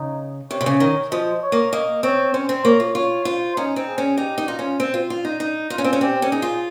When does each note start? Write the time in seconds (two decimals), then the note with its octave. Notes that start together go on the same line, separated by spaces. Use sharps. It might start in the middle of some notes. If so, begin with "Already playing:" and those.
Already playing: C#3 D#4
0.51 C3 C#5
0.61 C3
0.66 C#3
0.80 D#3
1.11 F3 D#5
1.43 C#5
1.52 A#3
1.73 A#3 D#5
2.03 C4 C#5
2.33 C#4 C5
2.49 C4
2.64 A#3 C#5
2.80 F4
2.95 F4 C#5
3.25 F4 C5
3.56 C#4 D#4
3.76 C4
3.87 G#4
3.98 C#4
4.18 D#4 G4
4.38 D#4
4.48 D#4 F4
4.59 C#4
4.80 C4
4.94 F4
5.10 F4
5.25 D#4
5.40 D#4
5.70 D#4 F4
5.78 C#4
5.84 C4
5.93 C#4
6.01 C4 G4
6.22 C#4
6.32 D#4 G#4
6.42 F4